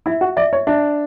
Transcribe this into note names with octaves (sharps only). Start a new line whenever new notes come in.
E4 E5
F#4
D5 E5
C#5
D4 E5